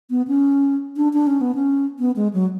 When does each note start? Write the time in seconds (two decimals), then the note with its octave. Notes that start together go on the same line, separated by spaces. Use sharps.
0.10 B3
0.28 C#4
0.96 D4
1.13 D4
1.27 C#4
1.41 B3
1.55 C#4
1.99 B3
2.16 G#3
2.34 F#3